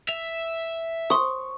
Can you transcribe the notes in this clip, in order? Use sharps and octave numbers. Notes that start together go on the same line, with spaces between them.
E5 F7
C6 C#6 D#6